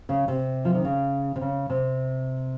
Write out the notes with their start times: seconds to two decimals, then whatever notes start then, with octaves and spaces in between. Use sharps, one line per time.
0.09 C#3
0.28 C3
0.65 F3
0.75 D#3
0.85 C#3
1.36 C3
1.41 C#3
1.70 C3